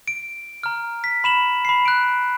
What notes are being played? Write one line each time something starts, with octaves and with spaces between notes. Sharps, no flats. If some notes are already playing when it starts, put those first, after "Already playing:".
D7
A#5 F6
B6
B5 E7 F#7
B5 C7
F#6 D7